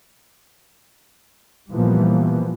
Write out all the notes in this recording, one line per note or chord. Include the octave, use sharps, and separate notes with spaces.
A#2 E3 F3 G3 A#3 B3